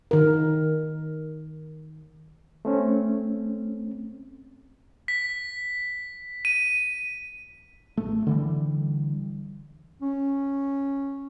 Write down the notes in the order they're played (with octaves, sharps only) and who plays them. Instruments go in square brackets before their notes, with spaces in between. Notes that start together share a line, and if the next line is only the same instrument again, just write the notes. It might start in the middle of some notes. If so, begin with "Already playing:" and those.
[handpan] D#3 A#4
[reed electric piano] A3 C4 C#4
[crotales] B6
D#7
[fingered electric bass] A1 A3
D3 E3 G3
[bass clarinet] C#4